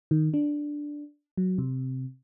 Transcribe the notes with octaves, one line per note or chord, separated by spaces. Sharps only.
D#3
D4
F#3
C3